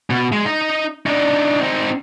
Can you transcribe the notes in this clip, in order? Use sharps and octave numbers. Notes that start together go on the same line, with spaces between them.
B2
G#3
D#4 D#5
D4 D#4
C4 D#4